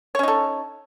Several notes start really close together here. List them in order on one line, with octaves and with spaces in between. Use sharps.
C#5 C#4 D#4 A4